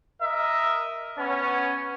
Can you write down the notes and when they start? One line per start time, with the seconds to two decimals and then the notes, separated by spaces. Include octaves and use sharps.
0.21 A#4 D#5 E5
1.18 B3 C#4